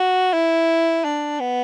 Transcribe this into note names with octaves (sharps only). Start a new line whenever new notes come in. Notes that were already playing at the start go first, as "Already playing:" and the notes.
Already playing: F#4
E4
D4
B3